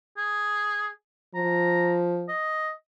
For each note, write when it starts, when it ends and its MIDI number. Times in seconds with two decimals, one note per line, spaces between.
0.17 0.88 68
1.35 2.29 53
1.35 1.96 82
2.29 2.70 75